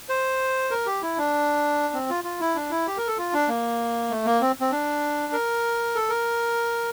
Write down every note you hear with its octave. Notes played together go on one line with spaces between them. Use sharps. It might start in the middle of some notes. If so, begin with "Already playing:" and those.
C5
A#4
G4
E4
D4
C4
F4
F4
E4
D4
E4
G4
A#4
A4
F4
D4
A#3
A3
A#3
C4
C4
D4
A#4
A4
A#4